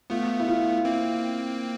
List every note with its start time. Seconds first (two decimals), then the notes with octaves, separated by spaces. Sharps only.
0.10 A3 B3 F4
0.40 E4
0.48 F4
0.85 A#3 C4